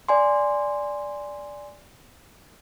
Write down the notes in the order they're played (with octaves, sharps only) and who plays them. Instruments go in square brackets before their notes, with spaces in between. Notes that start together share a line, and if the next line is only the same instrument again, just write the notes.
[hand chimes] D5 G#5 C6